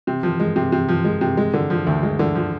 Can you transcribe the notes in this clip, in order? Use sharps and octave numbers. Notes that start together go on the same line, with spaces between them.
C3
F3
G#3
C3
C3
F3
G#3
C3
G#3
D3
F3
D2
G#3
D3
F3